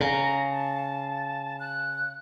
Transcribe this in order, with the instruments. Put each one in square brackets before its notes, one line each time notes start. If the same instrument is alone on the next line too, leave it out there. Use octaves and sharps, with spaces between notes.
[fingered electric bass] C#3 [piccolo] A#5
[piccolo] A5
F#6